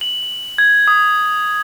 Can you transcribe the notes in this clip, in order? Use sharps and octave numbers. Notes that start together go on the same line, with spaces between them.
F#7
G#6
D#6